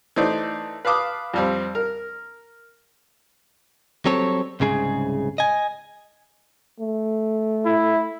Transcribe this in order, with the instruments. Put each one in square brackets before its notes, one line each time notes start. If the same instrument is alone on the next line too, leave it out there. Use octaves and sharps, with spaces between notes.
[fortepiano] E3 A3 D#4 C5 D5
B4 F5 A5 D6 D#6
F2 G3 C4
A#4
[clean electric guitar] F#3 G3 C4 A4 C#5
C2 G#2 C#3 G#4
D#5 G#5
[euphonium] A3
[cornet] E4